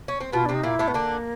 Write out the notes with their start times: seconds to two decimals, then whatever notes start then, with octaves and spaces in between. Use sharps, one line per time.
0.08 C#4
0.20 C4
0.32 B2 B3 F4
0.46 C3 C4 D4
0.55 D#4
0.63 A#2 A#3 E4
0.79 A2 A3
0.88 B3
0.94 D3 A#3 D4